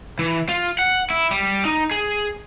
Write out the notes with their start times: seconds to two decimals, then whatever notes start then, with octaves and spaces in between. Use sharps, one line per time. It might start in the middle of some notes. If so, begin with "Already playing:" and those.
0.19 E3
0.49 F4
0.79 F#5
1.10 E4
1.31 G3
1.65 D#4
1.91 G#4